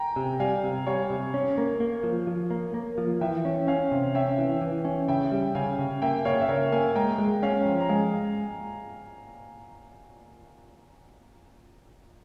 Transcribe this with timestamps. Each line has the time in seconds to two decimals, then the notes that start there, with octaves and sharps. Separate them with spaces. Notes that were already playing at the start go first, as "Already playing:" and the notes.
Already playing: G5 G#5 A#5
0.16 C3
0.40 G3 F5 G#5
0.63 C3
0.87 G3 C#5 F5
1.10 C3
1.34 C#4
1.58 A#3
1.80 A#3
2.03 F3
2.27 F3
2.50 A#3
2.74 A#3
2.98 F3
3.21 E3 E5 G5
3.45 C#4
3.67 C#4 F5 G#5
3.92 C3
4.15 C#4 E5 G5
4.38 E3
4.61 E3
4.85 C#4
5.08 C#3 E5 G5
5.32 G3
5.55 C#3 F5 G#5
5.79 C#3
6.02 A#3 E5 G5
6.25 C#3 C#5 F5
6.41 E5
6.48 C#3 A#4 C#5
6.72 A#3 F5 G#5
6.95 G#3 G5 A#5
7.18 G#3
7.42 C#4 F5 G#5
7.65 F3
7.80 A#5
7.89 G#3 F5 G#5